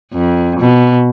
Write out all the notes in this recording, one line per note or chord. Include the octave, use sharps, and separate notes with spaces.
F2
B2